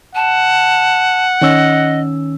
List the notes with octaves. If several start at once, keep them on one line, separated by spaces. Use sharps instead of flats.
F#5 A5
D#3 C#4 D#5 E6